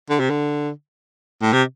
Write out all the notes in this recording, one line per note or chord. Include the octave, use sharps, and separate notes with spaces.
D3
C3
D3
A2
C3